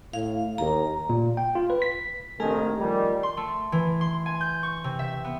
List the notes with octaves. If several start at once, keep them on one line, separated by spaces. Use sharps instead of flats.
A2 F5
D#2 A#5
A#2
G5
F4
B4
B6
A#1 C3 D#3 A3 A4 G#5
D#3 F3 G3
C6
A3
E3
C6
G#5
G6
C#6
C3
E5
B3